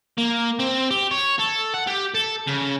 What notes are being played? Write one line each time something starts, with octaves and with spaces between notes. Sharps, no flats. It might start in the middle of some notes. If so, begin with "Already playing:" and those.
A#3
C4
G4
C#5
A4
F#5
G4
A4
C#3